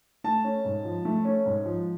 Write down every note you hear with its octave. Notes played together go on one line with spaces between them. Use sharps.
A3 A5
C#4
G#2
F3
A3
C#4
G#2
F3